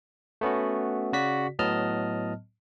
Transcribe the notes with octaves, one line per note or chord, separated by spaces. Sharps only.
A3 B3 C#4 F#4
C#3 F#4 D5 B6
A2 F#3 B3 D#5 A5 F6